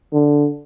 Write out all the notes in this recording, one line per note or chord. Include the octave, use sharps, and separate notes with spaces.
D3